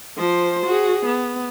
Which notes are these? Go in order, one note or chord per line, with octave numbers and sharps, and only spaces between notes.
F3 C5
F#4 G#4
B3